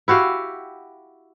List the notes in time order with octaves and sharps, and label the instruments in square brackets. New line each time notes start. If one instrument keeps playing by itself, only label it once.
[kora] E4 F#4 G4 F5